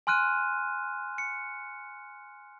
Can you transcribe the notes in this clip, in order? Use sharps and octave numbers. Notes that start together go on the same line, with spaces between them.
G#5 C6 F6 F#6 D#7
C#7